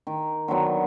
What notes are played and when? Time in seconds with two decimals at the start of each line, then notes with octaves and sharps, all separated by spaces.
0.07 D#3
0.48 D3 D#3 F#3 B3